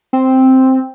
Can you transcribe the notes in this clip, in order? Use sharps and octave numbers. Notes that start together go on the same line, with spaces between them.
C4